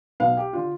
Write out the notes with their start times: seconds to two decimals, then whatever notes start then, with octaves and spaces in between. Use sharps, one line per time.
0.20 B1 B2 B3 F5
0.37 G4
0.53 D3 F4